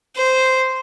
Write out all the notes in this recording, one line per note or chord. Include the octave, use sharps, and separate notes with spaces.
C5